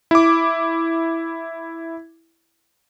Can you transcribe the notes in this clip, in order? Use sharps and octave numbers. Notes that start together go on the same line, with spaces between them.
E4 D6